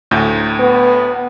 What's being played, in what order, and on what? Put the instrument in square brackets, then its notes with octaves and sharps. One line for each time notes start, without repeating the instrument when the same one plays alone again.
[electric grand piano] D2 A2 G6
[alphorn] B3